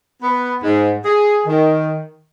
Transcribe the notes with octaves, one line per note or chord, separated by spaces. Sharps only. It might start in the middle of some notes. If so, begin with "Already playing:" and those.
B3
G#2
G#4
D#3